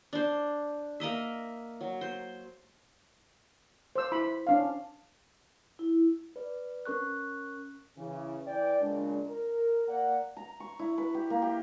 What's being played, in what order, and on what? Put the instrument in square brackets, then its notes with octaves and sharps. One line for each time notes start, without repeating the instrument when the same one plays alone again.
[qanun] D4 C5
A#3 A#4 D#5 E5
F#3
C5
[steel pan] C5 E6
E4 B5
C#4 D4 F5
[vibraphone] E4
[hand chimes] B4 D5
C#4 A#4 C#6 F#6
[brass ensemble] C#3 E3
E3 D5 G5
A#2 C#3 G#3 D4
A#4
A#3 D5 F#5
[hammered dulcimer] A#5
C#6
E4
B4
G4
A#3
G4